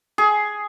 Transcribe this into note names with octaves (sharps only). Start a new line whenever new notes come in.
G#4